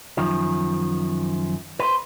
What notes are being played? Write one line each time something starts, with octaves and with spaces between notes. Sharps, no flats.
F#2 D#3 F3
B4 C5